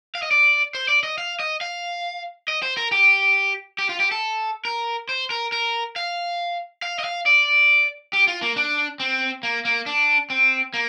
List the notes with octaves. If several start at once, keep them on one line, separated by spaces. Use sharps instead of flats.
F5
D#5
D5
C5
D5
D#5
F5
D#5
F5
D#5
C5
A#4
G4
G4
F4
G4
A4
A#4
C5
A#4
A#4
F5
F5
D#5
F5
D5
G4
F4
A#3
D4
C4
A#3
A#3
D4
C4
A#3